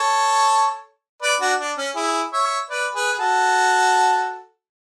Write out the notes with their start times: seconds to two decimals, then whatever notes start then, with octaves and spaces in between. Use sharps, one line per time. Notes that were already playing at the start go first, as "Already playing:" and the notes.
Already playing: A4 C#5
1.22 B4 D5
1.40 D4 F#4
1.59 D4
1.78 C#4
1.96 E4 G#4
2.33 C#5 E5
2.70 B4 D5
2.95 G#4 B4
3.12 G#4
3.19 F#4 A4